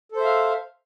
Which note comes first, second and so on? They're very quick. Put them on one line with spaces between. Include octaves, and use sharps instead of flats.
A4 C5 E5 F5